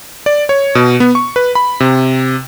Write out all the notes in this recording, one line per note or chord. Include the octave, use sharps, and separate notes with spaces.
D5
C#5
B2
B3
C#6
B4
B5
C3